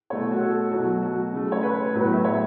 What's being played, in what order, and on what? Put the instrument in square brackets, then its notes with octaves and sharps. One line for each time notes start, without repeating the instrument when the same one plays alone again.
[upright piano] B2 A3 C#5
F#4
A4
B2 F#3 A3 F#4
F#4
C#3 A3
C#5
B4
A2 F#3 B3 B4
E5
C#5